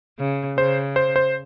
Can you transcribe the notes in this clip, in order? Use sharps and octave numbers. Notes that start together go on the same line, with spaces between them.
C#3
C#3 C5
C5
C5